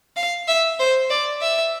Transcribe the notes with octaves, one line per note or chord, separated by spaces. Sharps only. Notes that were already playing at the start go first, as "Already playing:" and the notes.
F5
E5
C5
D5
E5